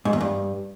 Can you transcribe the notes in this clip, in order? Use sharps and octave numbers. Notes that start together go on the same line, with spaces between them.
G#2
E2
G2